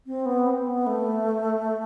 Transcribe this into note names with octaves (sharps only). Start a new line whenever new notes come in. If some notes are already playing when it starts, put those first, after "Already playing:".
C4
B3
C4
B3
A3